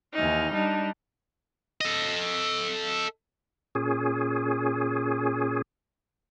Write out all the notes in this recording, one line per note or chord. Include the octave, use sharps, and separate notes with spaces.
D#2 E3 D#4 F6
G3 D4 D#4
A4 D#5
A#2 C#4 G#4